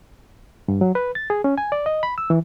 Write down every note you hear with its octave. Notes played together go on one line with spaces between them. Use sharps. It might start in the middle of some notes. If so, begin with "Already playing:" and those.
G2
F#3
B4
A6
G#4
C#4
G#5
D5
D#5
B5
E6
E3